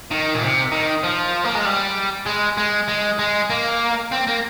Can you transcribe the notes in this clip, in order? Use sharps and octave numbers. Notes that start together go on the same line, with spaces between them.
D#3
A#2
C3
D#3
F3
A#3
G#3
G3
G#3
G#3
G#3
G#3
A#3
C4
A#3